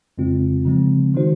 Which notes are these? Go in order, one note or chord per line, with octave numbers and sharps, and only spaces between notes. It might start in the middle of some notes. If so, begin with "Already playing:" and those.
F2 C#3 G#3 C4 F4
C#3 F3 G#3 C4
D#3 G#3 D#4 F#4 C5